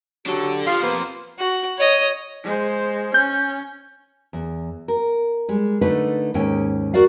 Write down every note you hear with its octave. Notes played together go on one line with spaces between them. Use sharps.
F#3 D4 G4 A4
F3 F4 F5
F2 A#3 B3 C5
F#4
C#5 D#5
G#3 C5
C#4 G6
E2
A#4
G3 G#3
D3 A3 D#4 B4
D#2 G#2 C#4 G5
F#4 A#4 D5 F5